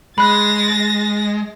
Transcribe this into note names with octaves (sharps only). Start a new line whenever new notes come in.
G#3 B5 F#6 A6 A#6